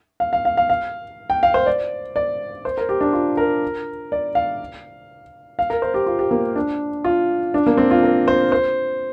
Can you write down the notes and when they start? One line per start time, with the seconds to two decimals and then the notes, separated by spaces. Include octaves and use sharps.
0.20 F5
0.33 F5
0.45 F5
0.57 F5
0.70 F5
1.30 G5
1.43 F5
1.54 C5
1.66 D5
2.16 D5
2.65 C5
2.77 A#4
2.89 G4
3.01 D4
3.13 F4
3.37 A#4
4.12 D5
4.35 F5
5.59 F5
5.70 A#4
5.82 C5
5.94 G4
6.07 F4
6.19 G4
6.31 A#3
6.56 D4
7.04 F4
7.54 D4
7.66 A#3
7.78 C4
7.91 F4
8.03 A#4
8.28 C5
8.52 C5